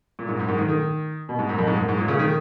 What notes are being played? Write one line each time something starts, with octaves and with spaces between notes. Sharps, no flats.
A#2
G#2
F#2
G#2
D#3
D#3
B2
G#2
F#2
F2
G#2
F#2
G#2
A#2
C#3
D#3